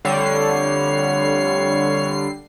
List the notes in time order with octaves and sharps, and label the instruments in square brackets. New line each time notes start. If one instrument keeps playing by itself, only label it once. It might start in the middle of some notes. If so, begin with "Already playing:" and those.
[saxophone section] F2 A3 C#5 [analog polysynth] D3 G3 C7